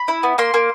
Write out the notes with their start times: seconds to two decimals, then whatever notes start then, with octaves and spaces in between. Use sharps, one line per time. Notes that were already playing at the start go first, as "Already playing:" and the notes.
Already playing: B5
0.08 E4
0.23 B3
0.38 A#3 C6
0.54 A#3